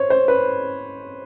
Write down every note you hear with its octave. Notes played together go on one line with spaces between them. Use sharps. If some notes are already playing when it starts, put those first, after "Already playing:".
Already playing: C5 C#5
C5
B4